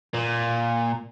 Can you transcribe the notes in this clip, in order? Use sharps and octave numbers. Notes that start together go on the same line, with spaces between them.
A#2